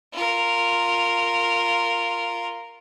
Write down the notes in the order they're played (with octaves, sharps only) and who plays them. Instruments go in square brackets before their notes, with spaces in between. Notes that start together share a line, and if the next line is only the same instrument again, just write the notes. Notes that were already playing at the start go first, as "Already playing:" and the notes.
[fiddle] F4 A#4